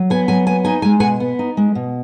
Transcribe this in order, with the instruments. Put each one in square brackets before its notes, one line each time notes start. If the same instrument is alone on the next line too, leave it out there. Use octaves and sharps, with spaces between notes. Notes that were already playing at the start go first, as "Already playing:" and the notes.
Already playing: [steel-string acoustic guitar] F#3
B3 G#5
F#3 G#5
B3 G#5
D#4 G#5
G#3 G#5
B2 F#5 G#5
B3
D#4
G#3
B2